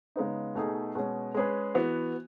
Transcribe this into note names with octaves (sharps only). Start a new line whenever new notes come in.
C#3 G#3 B3 D#4
B2 A3 D#4 G#4
B2 G#3 C#4
G#3 C#4 G#4 B4
E3 B3 F#4